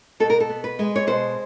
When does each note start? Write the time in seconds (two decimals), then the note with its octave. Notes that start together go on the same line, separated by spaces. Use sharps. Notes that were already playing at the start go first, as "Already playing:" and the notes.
0.20 B2 A4
0.30 A#4
0.40 A4
0.49 B3
0.64 B4
0.79 G#3
0.96 C#5
1.07 B2 C5